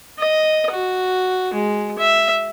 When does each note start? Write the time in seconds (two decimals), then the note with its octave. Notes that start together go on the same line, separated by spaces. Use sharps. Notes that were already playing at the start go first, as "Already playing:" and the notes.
0.19 D#5
0.71 F#4
1.53 G#3
1.98 E5